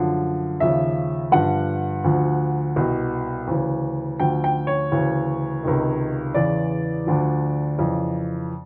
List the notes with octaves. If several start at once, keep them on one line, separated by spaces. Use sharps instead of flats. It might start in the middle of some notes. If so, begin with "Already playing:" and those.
Already playing: F#2 D3 F3
D#2 C#3 F3 E5
G2 D3 F3 F#5
D2 D3 F3
C2 B2
D2 C#3 E3
D2 D3 F3 G5
G5
C#5
D2 C#3 E3
C#2 C3 D#3
E2 C#3 E3 D5
D2 D3 F3
F2 C#3 E3